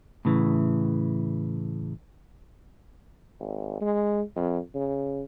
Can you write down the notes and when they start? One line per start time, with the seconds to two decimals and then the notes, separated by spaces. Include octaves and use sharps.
0.25 A2 C#3 E3
3.40 G#1
3.81 G#3
4.36 F2
4.75 C#3